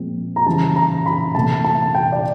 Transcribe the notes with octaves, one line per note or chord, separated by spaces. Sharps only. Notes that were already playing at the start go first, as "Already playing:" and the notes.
Already playing: A#2 F3 G#3 C4
A#5
C#3 E3 G3 A5
A#5
B5
C3 E3 A3 A5
A5
G5
D5